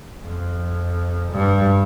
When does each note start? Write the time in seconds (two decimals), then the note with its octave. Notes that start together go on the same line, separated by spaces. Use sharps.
0.24 F2
1.31 G2